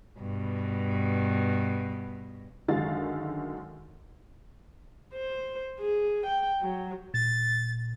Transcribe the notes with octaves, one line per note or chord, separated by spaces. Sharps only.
G2 B2
F#2 D3 D#3 G#3 F5 A6
C5
G#4
G5
F#3
A#2 A6